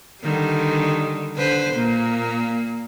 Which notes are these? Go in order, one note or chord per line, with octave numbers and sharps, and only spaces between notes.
D3 D#3 G3
D3 B4 C5
A#2 A#3